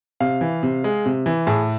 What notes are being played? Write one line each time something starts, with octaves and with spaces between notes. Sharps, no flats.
C3 F5
E3
C3
G#3
C3
E3
A2 G#4